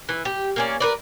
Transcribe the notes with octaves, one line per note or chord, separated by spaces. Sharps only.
E3
G4
A#3 C#4 D5
A#4 B4 D5